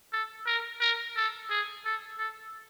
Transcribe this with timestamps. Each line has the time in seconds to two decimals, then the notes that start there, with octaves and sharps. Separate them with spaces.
0.13 A4
0.47 A#4
0.81 A#4
1.16 A4
1.50 G#4
1.85 A4
2.18 A4